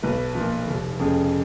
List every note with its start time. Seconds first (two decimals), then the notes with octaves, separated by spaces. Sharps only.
0.03 B1 B4
0.35 A#2 F3
0.68 F1
0.99 F2 C#3